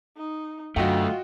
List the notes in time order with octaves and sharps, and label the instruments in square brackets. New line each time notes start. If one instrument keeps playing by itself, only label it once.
[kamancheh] D#4
[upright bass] F#2 [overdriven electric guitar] D3 A3 [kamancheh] F4 [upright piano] F#4 D#5 G5